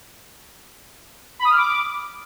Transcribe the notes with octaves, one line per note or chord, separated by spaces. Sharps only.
B5
D#6
F6
D6